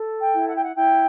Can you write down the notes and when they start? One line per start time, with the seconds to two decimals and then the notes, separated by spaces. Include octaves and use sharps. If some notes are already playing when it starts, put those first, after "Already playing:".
Already playing: A4
0.20 G5
0.34 E4
0.47 F#5
0.55 G5
0.63 F#5
0.76 E4 G5